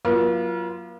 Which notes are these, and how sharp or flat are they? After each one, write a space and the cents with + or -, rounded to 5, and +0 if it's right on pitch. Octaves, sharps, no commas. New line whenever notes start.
F#3 -15 A#3 +45 F4 -25